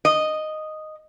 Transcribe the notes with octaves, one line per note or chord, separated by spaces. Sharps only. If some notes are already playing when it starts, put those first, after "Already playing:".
D#5